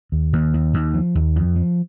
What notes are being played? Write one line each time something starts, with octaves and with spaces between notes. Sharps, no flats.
D#2
D#2
D#2
D#2
F3
D#2
F2
F3